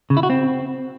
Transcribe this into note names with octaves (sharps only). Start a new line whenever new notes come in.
C#3
E4
F#4
C4